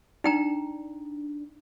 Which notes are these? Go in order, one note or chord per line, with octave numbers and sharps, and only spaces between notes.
D4 D#4 G5 A#5